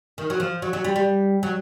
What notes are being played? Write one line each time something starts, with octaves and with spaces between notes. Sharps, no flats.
D#3
F#3
F3
F#3
F#3
G3
G3
F#3